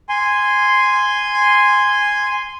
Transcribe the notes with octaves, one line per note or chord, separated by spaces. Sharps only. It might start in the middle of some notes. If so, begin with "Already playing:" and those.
G#5 C6